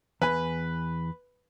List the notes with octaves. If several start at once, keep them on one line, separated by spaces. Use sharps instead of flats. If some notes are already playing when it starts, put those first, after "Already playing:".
E2 B4 G#5